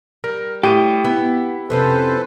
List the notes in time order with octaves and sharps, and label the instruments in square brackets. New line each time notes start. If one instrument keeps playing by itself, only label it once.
[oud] G3 [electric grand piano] A#4
[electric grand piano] A2 D#7 [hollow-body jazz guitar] G4
[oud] B3 [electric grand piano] E4
[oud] F2 C3 C#4 [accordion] A4 B4 C5